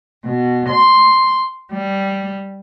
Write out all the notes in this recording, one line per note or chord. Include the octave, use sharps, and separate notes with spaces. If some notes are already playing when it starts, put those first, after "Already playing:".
B2
C6
G3